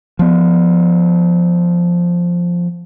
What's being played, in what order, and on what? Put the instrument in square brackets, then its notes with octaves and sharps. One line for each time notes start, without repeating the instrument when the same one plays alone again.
[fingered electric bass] F3 B3